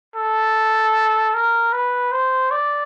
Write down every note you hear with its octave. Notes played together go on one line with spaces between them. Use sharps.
A4
A#4
B4
C5
D5